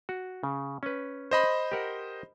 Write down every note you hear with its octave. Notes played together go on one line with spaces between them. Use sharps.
F#4
C#3
C#4 B4
C5 D#5 B5
G4 A#4 F#5